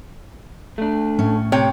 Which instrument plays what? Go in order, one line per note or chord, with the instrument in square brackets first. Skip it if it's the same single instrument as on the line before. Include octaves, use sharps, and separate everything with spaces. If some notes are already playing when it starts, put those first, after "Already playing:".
[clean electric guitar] A3 D4
[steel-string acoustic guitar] A2 C#4
[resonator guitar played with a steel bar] C3 C#5 G5